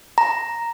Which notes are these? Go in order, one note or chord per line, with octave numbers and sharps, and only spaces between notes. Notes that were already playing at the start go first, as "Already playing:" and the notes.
A#5